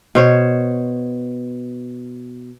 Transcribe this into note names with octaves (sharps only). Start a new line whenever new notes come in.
B2 C5 C#5